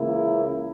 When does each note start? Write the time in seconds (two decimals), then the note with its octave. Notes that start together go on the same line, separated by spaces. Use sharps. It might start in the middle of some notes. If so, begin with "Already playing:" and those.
Already playing: C#2 C#3 E3 A#3 E4